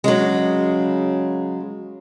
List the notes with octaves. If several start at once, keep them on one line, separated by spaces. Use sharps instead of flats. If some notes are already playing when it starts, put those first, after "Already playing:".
C#3 F#3 G#3